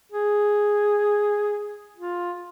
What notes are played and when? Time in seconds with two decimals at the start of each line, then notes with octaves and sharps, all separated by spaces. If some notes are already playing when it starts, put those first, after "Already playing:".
0.12 G#4
1.97 F4